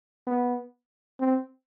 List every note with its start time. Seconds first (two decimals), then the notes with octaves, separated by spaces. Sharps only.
0.27 B3
1.20 C4